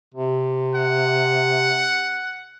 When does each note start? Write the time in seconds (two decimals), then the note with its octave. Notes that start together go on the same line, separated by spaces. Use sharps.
0.14 C3
0.75 F#5